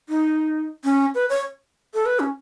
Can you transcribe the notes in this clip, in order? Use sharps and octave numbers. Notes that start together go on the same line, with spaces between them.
D#4
C#4
B4
C#5
A4
B4
C#4